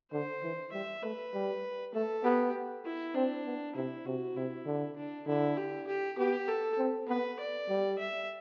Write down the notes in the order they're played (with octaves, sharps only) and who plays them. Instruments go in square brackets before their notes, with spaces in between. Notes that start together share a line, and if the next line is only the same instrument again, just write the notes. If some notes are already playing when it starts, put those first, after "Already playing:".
[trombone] D3 [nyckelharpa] C5
[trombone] E3
[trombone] G3 [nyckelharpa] E5
[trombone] A3 [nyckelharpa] B4
[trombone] G3
[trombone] A3 [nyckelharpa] A4
[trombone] B3 [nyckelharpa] G4
[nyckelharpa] E4
[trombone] C4 [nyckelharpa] D4
[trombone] B3
[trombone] C3 [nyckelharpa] E4
[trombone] C3 [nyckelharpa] F#4
[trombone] C3 [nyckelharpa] E4
[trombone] D3
[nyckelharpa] D4
[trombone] D3 [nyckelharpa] E4
[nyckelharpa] G4
G4
[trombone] B3 [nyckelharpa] G4
[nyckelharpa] A4
[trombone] C4
[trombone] B3 [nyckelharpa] B4
[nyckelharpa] D5
[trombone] G3
[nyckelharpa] E5